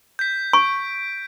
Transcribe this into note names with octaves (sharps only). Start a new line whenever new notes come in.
G6 B6
C#6 D7